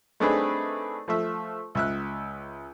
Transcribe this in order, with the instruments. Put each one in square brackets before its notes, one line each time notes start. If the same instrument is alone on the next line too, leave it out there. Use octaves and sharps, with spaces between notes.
[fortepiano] A3 C4 D4 D#4 G#4 B4
F3 A3 E5
C#2 E5 F#6